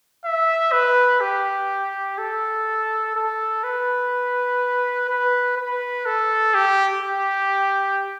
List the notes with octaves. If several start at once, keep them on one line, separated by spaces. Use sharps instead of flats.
E5
B4
G4
A4
A4
B4
B4
B4
A4
G4
G4